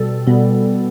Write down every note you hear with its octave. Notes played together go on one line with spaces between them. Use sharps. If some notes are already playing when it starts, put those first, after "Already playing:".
Already playing: B2 G3 A4
B2 G3 B3